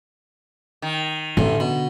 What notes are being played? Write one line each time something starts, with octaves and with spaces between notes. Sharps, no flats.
D#3
A1 A2 D3
B2